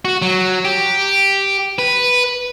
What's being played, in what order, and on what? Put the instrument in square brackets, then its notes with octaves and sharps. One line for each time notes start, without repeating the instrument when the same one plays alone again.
[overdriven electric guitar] F#4
F#3
G4
B4